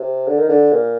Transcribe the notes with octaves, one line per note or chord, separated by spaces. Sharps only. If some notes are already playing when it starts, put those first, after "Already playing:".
Already playing: C3
D3
D#3
D3
A#2